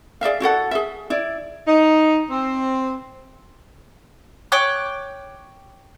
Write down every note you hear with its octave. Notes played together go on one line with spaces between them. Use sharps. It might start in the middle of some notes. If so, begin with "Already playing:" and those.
G#4 D5 E5 F5
E4 F#4 A4 F#5
G#4 E5
E4 D5
D#4
C4
C#5 G5 D6 F#6